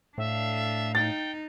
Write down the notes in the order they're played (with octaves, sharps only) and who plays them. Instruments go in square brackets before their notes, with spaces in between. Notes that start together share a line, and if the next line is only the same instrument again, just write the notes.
[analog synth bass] A2 [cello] D4 F5 [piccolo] E5
[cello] D#4 [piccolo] G5 [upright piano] A6